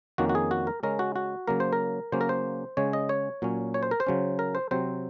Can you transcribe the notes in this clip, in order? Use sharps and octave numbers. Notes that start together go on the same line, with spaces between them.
F2 D#3 A#3 C#4 F#4
F#4
G#4
F#4
A#4
C#3 G#3 C#4 A#4
F#4
F#4
C#3 F#3 A#3 A#4
C5
A#4
C#3 F#3 A#3 C#4 C5
A#4
C5
C#3 G#3 C#4 C#5
D#5
C#5
A#2 F#3 C#4
C#5
C5
A#4
C5
C#3 F#3 C#4
A#4
C5
C3 F#3 C4 C5